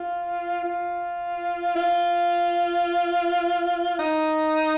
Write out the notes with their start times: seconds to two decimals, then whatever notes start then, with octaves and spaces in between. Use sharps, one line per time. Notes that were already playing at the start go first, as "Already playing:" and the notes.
Already playing: F4
0.64 F4
1.76 F4
3.99 D#4